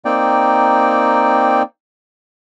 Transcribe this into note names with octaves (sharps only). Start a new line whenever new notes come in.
A#3 C4 D#4 D5 G5